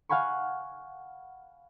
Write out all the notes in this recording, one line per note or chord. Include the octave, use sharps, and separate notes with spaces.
F5 F#5 G#5 B5 C#6